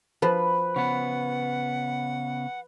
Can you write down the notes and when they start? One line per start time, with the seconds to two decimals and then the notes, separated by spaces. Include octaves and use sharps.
0.22 F3 B4
0.76 C#3 B3 F#5